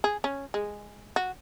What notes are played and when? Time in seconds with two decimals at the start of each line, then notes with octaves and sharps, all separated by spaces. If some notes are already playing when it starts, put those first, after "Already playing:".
0.04 G#4
0.24 C#4
0.54 G#3
1.16 F#4